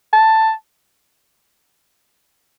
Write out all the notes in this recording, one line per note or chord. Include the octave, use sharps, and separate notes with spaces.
A5